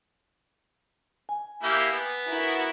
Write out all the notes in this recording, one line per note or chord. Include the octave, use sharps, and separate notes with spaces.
G#5
A#3 E4 G4
B3
E4 F#4 A#4